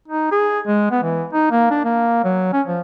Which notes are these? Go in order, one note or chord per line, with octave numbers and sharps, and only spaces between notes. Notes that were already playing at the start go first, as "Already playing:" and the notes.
D#4
G#4
G#3
B3
E3
D#4
A#3
D4
A#3
F#3
C#4
F3